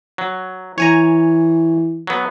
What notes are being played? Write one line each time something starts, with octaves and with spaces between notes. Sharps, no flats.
F#3
E3 C#5 G#5 A#5
F#3 B3